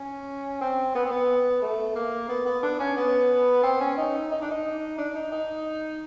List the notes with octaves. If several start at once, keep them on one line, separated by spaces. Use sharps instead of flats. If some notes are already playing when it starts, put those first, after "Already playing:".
Already playing: C#4
C4
B3
C4
B3
A3
A#3
B3
B3
D4
C#4
B3
C4
C#4
D#4
D#4
D4
D#4
D4
D#4
D#4